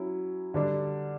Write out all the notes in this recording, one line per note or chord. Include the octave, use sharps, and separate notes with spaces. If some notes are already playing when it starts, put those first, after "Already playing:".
Already playing: F#3 C#4 E4
D3 G3 D4